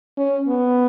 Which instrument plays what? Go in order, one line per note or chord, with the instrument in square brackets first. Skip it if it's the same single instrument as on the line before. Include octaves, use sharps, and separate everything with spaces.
[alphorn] C#4
B3